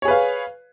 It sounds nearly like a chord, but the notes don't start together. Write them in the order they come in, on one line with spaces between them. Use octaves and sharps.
C#5 G#4 B4 F5